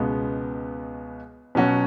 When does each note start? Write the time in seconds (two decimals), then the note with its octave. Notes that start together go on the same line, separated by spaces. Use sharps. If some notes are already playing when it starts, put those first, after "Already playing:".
Already playing: C#2 B2 G#3 B3
1.55 B2 F#3 C#4 F#4